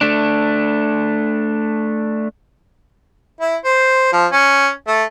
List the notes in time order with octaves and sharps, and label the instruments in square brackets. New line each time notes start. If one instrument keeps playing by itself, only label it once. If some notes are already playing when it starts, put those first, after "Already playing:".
[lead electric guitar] A3 D4
[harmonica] E4
C5
F3
C#4
A3